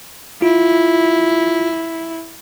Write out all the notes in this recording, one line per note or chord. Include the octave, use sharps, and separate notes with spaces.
E4 F4